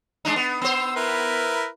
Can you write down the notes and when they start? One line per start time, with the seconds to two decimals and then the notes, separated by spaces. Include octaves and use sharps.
0.25 G#3 D4 D#4
0.36 B3
0.62 B3 C5 E6
0.96 E4 A#4 B4